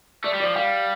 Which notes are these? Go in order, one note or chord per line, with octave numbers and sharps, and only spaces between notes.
A3 D5
G3
F3 D5
G3 F5